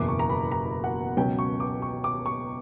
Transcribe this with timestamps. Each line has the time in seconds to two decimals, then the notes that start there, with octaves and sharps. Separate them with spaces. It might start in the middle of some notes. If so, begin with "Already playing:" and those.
Already playing: F#1 E2 B2 D6
0.08 C#6
0.19 A#5
0.30 B5
0.52 A#5
0.84 F#5
1.17 C#2 B2 F#3 C#4 G5
1.39 C#6
1.60 D6
1.82 C#6
2.04 D6
2.26 C#6